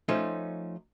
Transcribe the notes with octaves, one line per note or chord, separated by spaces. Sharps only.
F3 A3 C#4 D#4 C5